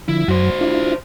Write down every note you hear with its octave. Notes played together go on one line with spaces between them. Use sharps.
D3 F3 E4
F#2 F#3 F#4 C5
D4 E4 F4